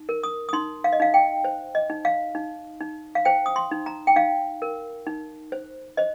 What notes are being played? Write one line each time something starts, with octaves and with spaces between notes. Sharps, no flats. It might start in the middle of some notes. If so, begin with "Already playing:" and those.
Already playing: D#4
A#4
D#6
D#6
D#4 C6
F5
D#5
D#4 F5
G5
C5
D#5
D#4
F5
D#4
D#4
F5
C5 G5
D#6
C6
D#4
A#5
G5
D#4 F5
A#4
D#4
C5
C5 D#5